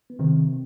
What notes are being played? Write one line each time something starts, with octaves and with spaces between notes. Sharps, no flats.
B3
C3 D#3 C4